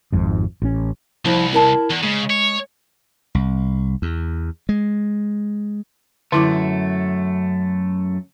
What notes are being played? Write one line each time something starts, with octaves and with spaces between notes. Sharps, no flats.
G#1 F2 G#2
A1 C#4
C2 F3 E4
E4 A#4 A5
E2
C#3 G#3
C#5
C2
E2
G#3
F#2 D3 A3 E4 D6